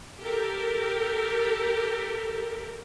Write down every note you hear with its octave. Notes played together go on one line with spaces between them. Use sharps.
G4 A4 A#4